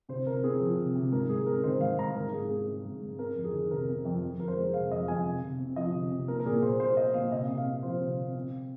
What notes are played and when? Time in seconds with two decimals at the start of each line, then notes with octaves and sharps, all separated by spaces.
0.09 C3 C5
0.26 C3 A#4
0.44 C4 G#4
0.60 F3
0.79 C3
0.95 C3
1.12 G#2 A#4
1.29 G#2 G#4
1.46 C4 A#4
1.64 D#3 C5
1.81 G#2 F5
1.98 G#2 A#5
2.15 G#2 A#4
2.32 G#2 G#4
2.49 C4 G#4
2.67 G#3
2.85 G#2
3.01 G#2
3.18 C4 A#4
3.35 F2
3.44 G#4
3.53 D#3
3.71 C3 A#4
3.88 C4
4.05 F2
4.22 F2
4.39 F2 A#4
4.48 C5
4.57 G#3
4.73 C3 F5
4.90 F2 D#5
5.08 F2 G#5
5.25 C3
5.43 C3
5.60 C4
5.76 F3 D#5
5.94 C3
6.11 C3
6.28 A#3 A#4
6.40 A#4
6.46 A#2 G#4
6.62 A#2 C5
6.80 A#3 C5
6.97 A#3 D#5
7.14 A#2 F5
7.32 C3 D#5
7.48 C3
7.58 F5
7.66 C4
7.83 F3 C5
8.01 C3
8.17 C3
8.34 C4